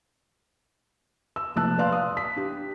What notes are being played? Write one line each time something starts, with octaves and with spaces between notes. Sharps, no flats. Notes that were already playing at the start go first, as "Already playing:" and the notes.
E6
F1 A#1 A5 E6 F#6
B4 D5 F5 C6 F#6
D#6
B6
D4 G4